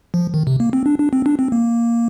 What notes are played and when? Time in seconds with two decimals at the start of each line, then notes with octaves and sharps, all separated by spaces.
0.14 F3
0.34 D#3
0.47 C3
0.60 A#3
0.73 C4
0.86 D4
1.00 D4
1.13 C4
1.26 D4
1.39 C4
1.52 A#3